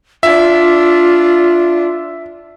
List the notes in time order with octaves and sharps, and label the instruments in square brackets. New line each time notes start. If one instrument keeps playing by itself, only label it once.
[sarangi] D4 [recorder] F4 [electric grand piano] E5